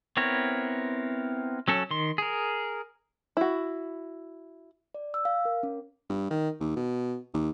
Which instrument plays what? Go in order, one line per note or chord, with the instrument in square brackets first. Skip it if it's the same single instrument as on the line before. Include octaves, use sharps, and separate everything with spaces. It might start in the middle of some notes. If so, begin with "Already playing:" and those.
[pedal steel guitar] B3 C4 E4 A#4 C#5
F#3 C#4 A4
D#3 C6
G#4 A#4
[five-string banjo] E4 F#4
[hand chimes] D5
E6
F5
A#4
C#4
[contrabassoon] G2
D#3
D#2
B2
D#2